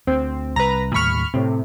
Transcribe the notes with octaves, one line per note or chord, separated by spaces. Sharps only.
D2 C4
C2 B4 A#5
D#2 A2 G3 B5 C#6 F6
A2 C3 C4